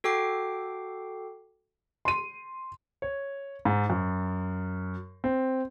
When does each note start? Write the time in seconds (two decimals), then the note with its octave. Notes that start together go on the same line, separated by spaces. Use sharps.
0.04 F#4 A4 G5 D6 C7
2.05 C6 D#7
3.02 C#5
3.65 G#2
3.90 F#2
5.24 C4